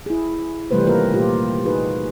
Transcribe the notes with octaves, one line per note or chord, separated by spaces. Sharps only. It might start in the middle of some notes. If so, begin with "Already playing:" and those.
E4 G#4
C3 E3 G3 A3 B4 C5
D#3 A#3 F4 A#4 B4
A#2 A3 F4 G4
D#4 F#4 G#4 B4